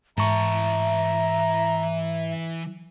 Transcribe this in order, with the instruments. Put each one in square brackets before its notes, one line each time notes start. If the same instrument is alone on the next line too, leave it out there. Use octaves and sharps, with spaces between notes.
[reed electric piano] G#2 C#6 [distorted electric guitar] E3 A5 [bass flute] E5 [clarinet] A#5